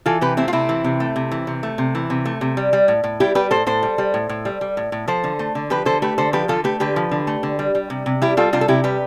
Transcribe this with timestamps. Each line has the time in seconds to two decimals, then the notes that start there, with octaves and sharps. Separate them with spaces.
0.06 E3 F4 A4
0.21 C3 G4 B4
0.37 A3 C4 E4
0.48 F4
0.53 C3 C4 E4
0.69 E3
0.84 C3
1.00 A3
1.16 C3
1.31 E3
1.47 C3
1.63 A3
1.78 C3
1.95 E3
2.10 C3
2.25 A3
2.41 C3
2.57 G3
2.73 G3
2.88 A2
3.04 A2
3.20 G3 E4 G4
3.35 G3 G4 B4
3.51 A2 A4 C5
3.66 A2 A4 C5
3.83 G3
3.98 G3
4.14 A2
4.29 A2
4.45 G3
4.61 G3
4.77 A2
4.92 A2
5.08 F3 A4 C5
5.24 D3
5.39 A3
5.55 D3
5.70 F3 G4 B4
5.85 D3 A4 C5
6.02 A3 G4 B4
6.18 D3 A4 C5
6.33 F3 G4 B4
6.48 D3 F4 A4
6.64 A3 G4 B4
6.80 D3 G4 B4
6.96 F3
7.11 D3
7.27 A3
7.43 D3
7.59 G3
7.75 G3
7.90 C3
8.06 C3
8.22 G3 E4 G4
8.37 G3 F4 A4
8.53 C3 D4 F4
8.61 A4
8.68 C3 E4 G4
8.84 G3 G4 B4